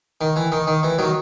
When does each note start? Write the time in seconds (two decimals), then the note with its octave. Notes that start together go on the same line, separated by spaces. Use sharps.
0.21 D#3
0.36 E3
0.52 D#3
0.67 D#3
0.83 E3
0.98 D#3 F#3